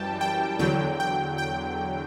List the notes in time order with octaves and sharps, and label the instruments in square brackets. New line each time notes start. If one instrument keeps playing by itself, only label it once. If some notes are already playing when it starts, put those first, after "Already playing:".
Already playing: [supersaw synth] F#2 E3 G3 G5 A5
G5
E2 D3 F#3 G5
G5
G5